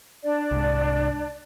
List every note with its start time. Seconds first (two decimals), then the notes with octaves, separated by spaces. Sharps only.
0.23 D4 D5
0.51 C2 G#2